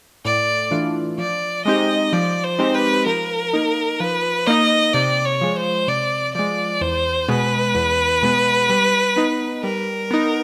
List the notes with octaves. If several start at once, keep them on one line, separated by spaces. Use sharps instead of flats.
A2 D5
E3 A3 D4 F4
F3 D5
G#3 C4 D#4 G4 D#5
F3 D5
C5
G#3 C4 D#4 G4
B4
F3 A#4
A#3 D#4
F3 B4
A#3 D#4 D#5
C3 D5
C#5
F3 G#3
C5
C3 D5
F3 G#3 D5
E2 C5
B2 G#3 B3 B4
E2
B2 G#3 B3
G3
B3 D#4
G3 A#4
B3 D#4